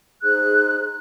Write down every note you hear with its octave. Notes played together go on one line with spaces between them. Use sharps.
D#4 G#4 C5 F#6